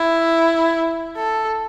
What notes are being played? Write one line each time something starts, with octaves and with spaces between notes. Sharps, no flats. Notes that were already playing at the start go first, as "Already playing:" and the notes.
Already playing: E4
A4